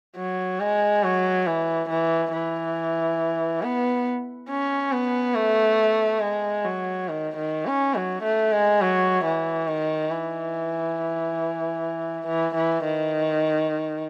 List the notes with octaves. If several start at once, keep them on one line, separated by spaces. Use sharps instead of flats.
F#3
G#3
F#3
E3
E3
E3
B3
C#4
B3
A3
G#3
F#3
D#3
D#3
C#4
F#3
A3
G#3
F#3
E3
D#3
E3
E3
E3
D#3